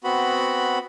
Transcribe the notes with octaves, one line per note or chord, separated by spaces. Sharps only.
B3 C4 F#4 B5